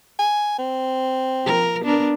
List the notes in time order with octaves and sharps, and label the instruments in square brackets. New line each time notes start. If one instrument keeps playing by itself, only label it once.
[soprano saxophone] G#5
C4
[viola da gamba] F3 A#4
B3 D4 A#4